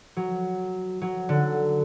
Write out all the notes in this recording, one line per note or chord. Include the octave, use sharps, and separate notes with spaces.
F#3
F#3
D3